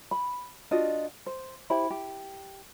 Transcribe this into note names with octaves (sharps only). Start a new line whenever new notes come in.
B5
D4 F4 F#4 D#5
C5
E4 G4 C5 B5
G4